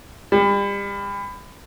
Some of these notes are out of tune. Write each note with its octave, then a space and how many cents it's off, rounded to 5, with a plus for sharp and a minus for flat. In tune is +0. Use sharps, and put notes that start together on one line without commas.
G3 +35